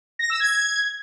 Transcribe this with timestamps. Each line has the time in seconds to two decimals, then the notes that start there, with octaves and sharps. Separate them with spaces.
0.19 A#6
0.30 E6
0.40 G#6